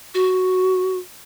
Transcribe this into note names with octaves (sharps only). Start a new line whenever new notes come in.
F#4